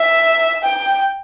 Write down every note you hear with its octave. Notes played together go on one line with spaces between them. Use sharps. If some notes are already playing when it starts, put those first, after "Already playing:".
Already playing: E5
G5